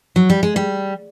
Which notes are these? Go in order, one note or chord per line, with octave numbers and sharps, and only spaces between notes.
F#3
G3
G#3
G3